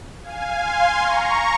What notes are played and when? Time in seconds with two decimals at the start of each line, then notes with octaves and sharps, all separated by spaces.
0.22 F5 G#5
0.60 G#5 C6
0.98 A#5 C#6